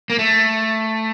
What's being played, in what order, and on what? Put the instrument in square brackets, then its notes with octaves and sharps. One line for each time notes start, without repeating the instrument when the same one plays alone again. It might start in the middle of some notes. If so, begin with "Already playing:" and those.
[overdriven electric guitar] A#3
A3